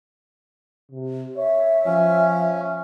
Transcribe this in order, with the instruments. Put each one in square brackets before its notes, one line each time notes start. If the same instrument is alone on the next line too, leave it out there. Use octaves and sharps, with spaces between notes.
[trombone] C3
[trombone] C#5 [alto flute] E5
[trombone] F3 [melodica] C#4